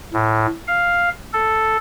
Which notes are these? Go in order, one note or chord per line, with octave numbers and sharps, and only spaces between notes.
A2
F5
A4